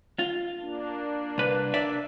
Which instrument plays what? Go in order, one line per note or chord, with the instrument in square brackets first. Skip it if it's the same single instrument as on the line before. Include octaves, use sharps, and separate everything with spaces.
[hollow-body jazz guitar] F4
[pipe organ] A#3 D4
[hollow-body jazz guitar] C2 B4
D5 E5